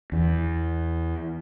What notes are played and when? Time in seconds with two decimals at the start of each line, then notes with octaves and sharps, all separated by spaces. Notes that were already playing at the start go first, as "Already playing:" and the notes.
0.12 E2